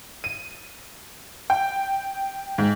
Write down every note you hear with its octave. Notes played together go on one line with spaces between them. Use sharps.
D#7
G5
G#2